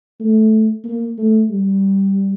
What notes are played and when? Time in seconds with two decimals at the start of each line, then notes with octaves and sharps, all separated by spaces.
0.20 A3
0.84 A#3
1.18 A3
1.50 G3